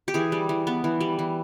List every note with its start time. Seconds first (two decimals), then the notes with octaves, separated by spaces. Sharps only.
0.08 G4
0.14 E3 G#4
0.32 G3
0.49 E3
0.67 B3
0.84 E3
1.01 G3
1.19 E3